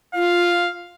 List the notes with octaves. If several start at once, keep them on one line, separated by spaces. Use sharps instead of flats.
F4 F5